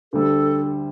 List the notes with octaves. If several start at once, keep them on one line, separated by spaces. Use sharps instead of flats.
D2 D3 G3 A4